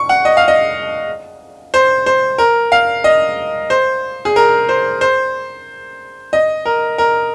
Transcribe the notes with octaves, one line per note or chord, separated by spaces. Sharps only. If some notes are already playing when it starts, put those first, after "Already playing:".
Already playing: C#6
F#5
D#5
F5
D#5
C5
C5
A#4
F5
D#5
C5
G#4
A#4
C5
C5
D#5
A#4
A#4